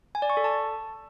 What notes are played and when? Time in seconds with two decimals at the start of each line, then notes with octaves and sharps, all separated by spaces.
0.15 G#5
0.22 D5
0.30 C#6
0.37 A4
0.44 A5